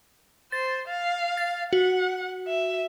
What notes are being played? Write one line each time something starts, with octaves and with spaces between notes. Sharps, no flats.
C5 A6
F5
A6
F#4 F#5
E5